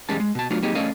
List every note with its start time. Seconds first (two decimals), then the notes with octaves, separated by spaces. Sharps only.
0.09 E2 G3 G#3 C#4 A5
0.20 G#3
0.35 B2 A5
0.50 F#3 A3 B3 D4 F4
0.62 F#3 A#3 C4 D#4 G4 G#4
0.75 A3 C#4 A4 D5 D#5 F5